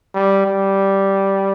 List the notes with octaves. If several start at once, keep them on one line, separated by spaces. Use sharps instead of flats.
G3
G3